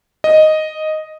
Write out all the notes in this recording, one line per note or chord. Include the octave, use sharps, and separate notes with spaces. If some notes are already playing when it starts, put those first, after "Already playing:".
D#5